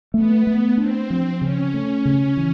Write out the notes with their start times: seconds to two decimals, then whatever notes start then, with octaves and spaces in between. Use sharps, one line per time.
0.14 A3 B3
0.47 A3
0.77 C4 D4
1.10 F3
1.41 C#3 C#4
1.74 A3
2.05 C#3
2.37 E3